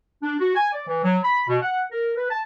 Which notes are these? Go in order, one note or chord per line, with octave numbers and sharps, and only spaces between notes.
D4
F#4
G#5
D5
E3
F#3
B5
B2
F#5
A#4
B4
A5